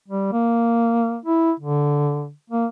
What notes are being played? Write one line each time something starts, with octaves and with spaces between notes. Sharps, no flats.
G3
A#3
E4
D3
A#3